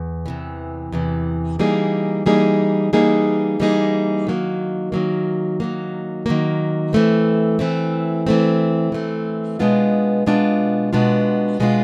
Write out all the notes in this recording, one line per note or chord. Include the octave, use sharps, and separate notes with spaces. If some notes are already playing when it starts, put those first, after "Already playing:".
Already playing: E2
E2 C3 E3
E2 C3 E3
E3 G3 A#3 D#4 G#4
E3 G3 A#3 D#4 G#4
E3 G3 A#3 D#4 G#4
E3 G3 A#3 D#4 G#4
D#3 F#3 A#3
D#3 F#3 A#3
D#3 F#3 A#3
D#3 F#3 A#3
E3 A3 C4
E3 A3 C4
E3 A3 C4
E3 A3 C4
B2 G#3 B3 D4 F4
B2 G#3 B3 D4 F4
B2 G#3 B3 D4 F4
B2 G#3 B3 D4 F4